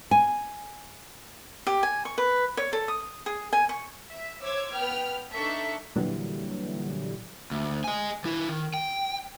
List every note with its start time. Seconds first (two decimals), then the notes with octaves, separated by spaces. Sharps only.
0.11 G#5
1.67 G4
1.83 G#5
2.05 C#6
2.18 B4
2.57 C#5
2.73 A4
2.88 D#6
3.26 G#4
3.53 G#5
3.69 C#6
4.12 E5
4.41 C5 C#5 D6 E6 G#6
4.73 B3 G5 F6
5.32 D4 D#4 A4 E5 C#6
5.96 A#2 D3 E3 F#3 G3
7.51 D2
7.84 D#5 G#5
8.25 D#3 E4
8.48 D#3
8.74 G5